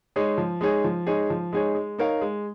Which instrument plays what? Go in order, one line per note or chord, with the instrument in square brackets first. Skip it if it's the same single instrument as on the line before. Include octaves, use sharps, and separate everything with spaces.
[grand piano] G#3 D#4 G#4 C#5
F3
G#3 D#4 G#4 C#5
F3
G#3 D#4 G#4 C#5
F3
G#3 D#4 G#4 C#5
G#3
D#4 A#4 C#5 F5
G#3